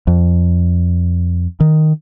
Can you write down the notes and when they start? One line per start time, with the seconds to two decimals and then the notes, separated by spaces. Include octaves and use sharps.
0.07 F2
1.60 D#3